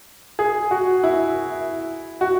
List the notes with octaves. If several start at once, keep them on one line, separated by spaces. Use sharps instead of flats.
G#4
F#4
E4
F#4